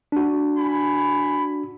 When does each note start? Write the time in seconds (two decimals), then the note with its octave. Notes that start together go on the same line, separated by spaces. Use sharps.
0.12 D4 F#4
0.58 G#5 B5